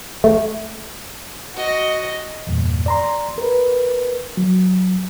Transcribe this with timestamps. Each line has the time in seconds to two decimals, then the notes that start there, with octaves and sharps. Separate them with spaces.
0.24 A3
1.54 F#4 D#5
2.47 E2 G2 A#2
2.86 D5 A#5 C6
3.38 A#4 B4
4.37 F#3